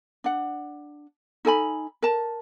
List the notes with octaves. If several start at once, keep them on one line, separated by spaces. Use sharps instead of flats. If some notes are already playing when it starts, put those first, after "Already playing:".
D4 F#5
D#4 A4 G#5 B5
A#4 A5